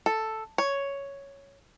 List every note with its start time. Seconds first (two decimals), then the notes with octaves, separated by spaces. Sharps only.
0.06 A4
0.58 C#5